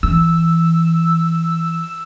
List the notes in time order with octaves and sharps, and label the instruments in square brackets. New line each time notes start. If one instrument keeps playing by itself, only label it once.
[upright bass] E3 [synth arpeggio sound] E6